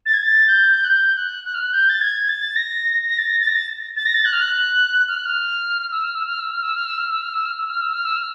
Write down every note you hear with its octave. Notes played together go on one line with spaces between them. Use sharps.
A6
G#6
A6
G6
F#6
G6
F#6
F#6
F6
F#6
G6
A6
G#6
A6
A#6
A#6
A6
A#6
A6
A#6
A6
A6
A#6
A6
F#6
F6
F#6
F6
F#6
F6
E6
F6
E6
F6
E6
F6
E6
F6
E6
F6
E6
F6
E6
F6
E6
F6
E6
F6
E6
F6